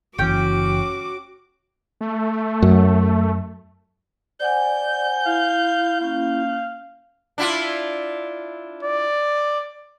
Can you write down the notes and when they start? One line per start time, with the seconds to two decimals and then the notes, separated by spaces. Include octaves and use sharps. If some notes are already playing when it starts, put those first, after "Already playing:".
0.18 F#1 E3 C#4 F#4 G5 D6
2.01 A3
2.62 F#2
4.40 C5 D5 F#5 G#5 G6
5.26 E4 F5
6.00 A#3 C#4 F5
7.38 D4 E4 F4
8.83 D5